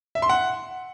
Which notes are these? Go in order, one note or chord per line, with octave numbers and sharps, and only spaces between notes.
E5
C6
F#5